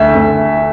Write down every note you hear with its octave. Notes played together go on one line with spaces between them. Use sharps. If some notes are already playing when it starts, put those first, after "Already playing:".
Already playing: D2 E5
D2